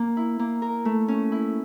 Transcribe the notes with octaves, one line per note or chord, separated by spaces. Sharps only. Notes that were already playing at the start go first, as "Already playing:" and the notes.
Already playing: A#3
E4
A#3
A#4
A3
C#4
E4